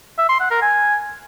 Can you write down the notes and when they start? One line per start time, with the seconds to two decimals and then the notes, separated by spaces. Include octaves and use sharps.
0.18 E5
0.29 C6
0.40 F#5
0.51 A#4
0.61 G#5